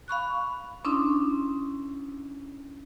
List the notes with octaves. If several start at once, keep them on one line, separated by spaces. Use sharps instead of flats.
F5 B5 C#6 F#6
C#4 D4 E4 C6 D#6